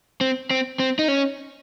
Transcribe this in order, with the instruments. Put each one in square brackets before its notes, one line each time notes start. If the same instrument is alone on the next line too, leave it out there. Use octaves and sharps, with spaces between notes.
[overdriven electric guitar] C4
C4
C4
D#4
C#4